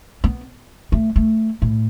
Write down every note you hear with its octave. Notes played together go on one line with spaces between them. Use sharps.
B3
A3
A3
A2